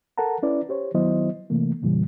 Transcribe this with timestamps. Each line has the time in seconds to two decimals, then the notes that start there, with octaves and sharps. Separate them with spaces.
0.18 A4 A#4 F#5 A5 A#5
0.43 C#4 E4 B4 D5
0.69 G4 C5 C#5
0.94 D#3 F#3 B3 E4 C5 D#5
1.50 C3 E3 A3 A#3
1.82 F2 A#2 C#3 E3 G3